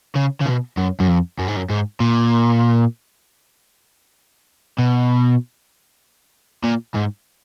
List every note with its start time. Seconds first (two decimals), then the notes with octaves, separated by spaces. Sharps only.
0.15 C#3
0.40 C#3
0.46 B2
0.77 F#2
1.00 F#2
1.08 F2
1.39 F#2
1.48 G#2
1.57 F#2
1.70 G#2
2.00 A#2
4.78 B2
6.64 A#2
6.95 G#2